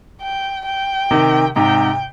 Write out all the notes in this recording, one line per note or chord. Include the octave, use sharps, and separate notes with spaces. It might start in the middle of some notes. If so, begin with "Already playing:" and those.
G5
G5
C3 D#3
G#2 C3 G5